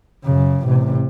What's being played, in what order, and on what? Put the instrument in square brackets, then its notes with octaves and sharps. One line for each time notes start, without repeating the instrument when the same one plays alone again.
[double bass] F#2 C#3
A1 C3